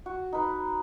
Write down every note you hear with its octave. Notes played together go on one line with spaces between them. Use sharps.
F#4
D#4 B4